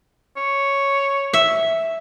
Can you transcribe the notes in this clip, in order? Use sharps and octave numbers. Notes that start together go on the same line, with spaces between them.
C#5
E5